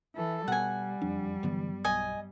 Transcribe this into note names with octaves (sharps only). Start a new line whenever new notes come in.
E3 A4
B2 G3 F#5 G#5
F#1 F2 F3 D4
G2 D3 E3 F#3 B3
B1 D#5 G#5